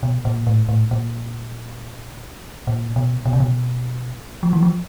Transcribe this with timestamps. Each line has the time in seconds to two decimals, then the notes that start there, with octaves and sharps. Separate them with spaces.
0.03 B2
0.25 A#2
0.47 A2
0.69 A2
0.91 A#2
2.67 A#2
2.96 B2
3.25 B2
3.33 C3
3.40 B2
4.43 F3
4.53 E3
4.63 F3